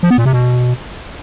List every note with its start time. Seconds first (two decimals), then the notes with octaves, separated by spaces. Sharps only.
0.03 F3
0.10 B3
0.18 A#2
0.25 C3
0.33 B2